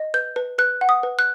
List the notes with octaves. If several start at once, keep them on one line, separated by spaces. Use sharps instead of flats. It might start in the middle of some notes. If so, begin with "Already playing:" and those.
Already playing: D#5
B4 G6
B4
B4 F#6
F#5
D#6
B4
F#6